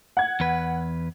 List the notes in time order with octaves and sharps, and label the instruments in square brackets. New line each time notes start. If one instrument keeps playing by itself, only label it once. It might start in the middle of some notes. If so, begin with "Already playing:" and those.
[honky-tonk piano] F#5 G#6
[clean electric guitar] E2 B4